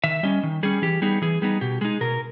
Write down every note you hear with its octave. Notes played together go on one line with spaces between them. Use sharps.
D#3 E5
G3 C#4 D#5
D#3
G3 C#4 G#4
E3 G4
G3 B3 D#4 G#4
E3 G#4
G3 B3 D#4 G#4
B2 G4
G#3 D#4 G#4
B2 A#4